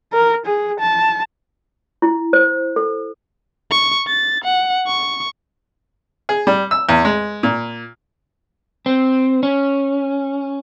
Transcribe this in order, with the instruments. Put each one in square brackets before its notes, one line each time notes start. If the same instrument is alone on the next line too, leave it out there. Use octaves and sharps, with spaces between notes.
[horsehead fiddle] A#4
G#4
A5
[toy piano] E4
C5
A4
[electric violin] C#6
A6
F#5
C#6
[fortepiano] G#4
G3
E6
E2
G#3
A#2
[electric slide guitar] C4
C#4